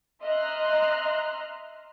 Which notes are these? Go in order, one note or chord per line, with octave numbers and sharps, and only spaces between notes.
D#5 E5 A#5 C6 F6 F#6